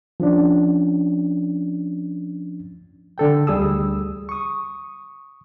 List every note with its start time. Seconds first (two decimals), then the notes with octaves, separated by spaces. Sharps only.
0.20 F3 C#4 D4
3.18 D3 A4 G5
3.47 D2 G3 G#4 D#6 E6
4.29 C#6 D#6